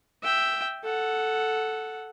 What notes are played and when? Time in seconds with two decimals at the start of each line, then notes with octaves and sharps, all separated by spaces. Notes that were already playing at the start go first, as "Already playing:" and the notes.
0.23 E5 G5
0.84 A4 F#5